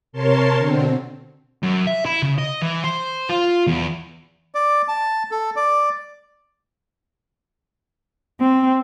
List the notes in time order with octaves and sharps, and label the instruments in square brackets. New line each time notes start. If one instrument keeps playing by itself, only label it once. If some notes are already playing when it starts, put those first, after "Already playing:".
[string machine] C3 A#4 C#5 A5 C6
B2 D3 C4
[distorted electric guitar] F#2
E5
E4
C#3
D#5
E3
C5
F4
E2
[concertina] D5
A5
A4
D5
[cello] C4